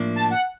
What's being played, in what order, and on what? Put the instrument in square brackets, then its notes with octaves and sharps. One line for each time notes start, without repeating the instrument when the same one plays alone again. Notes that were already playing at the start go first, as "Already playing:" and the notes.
Already playing: [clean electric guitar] A2 F3 A#3 D4
[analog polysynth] A5
F#5